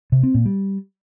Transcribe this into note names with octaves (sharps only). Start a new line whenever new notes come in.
C3
C4
A#2
G3